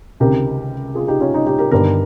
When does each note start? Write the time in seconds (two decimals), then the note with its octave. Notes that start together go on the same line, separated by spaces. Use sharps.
0.20 C#2 C3 D#3 G4 A#4
0.95 F4 G#4
1.08 D#4 G4
1.20 C#4 F4
1.34 D#4
1.47 D#4 G4
1.59 G4 A#4
1.71 G1 G2 D#3 G4 A#4